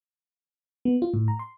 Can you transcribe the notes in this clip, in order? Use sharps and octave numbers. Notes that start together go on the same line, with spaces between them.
B3
F4
A2
A#5
C6